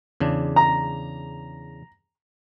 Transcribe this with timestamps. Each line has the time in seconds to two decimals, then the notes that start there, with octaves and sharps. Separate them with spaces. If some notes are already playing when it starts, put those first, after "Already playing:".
0.20 E2 C#3 D4
0.56 A#5